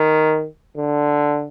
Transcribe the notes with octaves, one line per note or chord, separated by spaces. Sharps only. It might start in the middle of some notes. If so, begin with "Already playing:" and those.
Already playing: D#3
D3